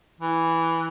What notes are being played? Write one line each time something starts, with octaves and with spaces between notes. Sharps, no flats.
E3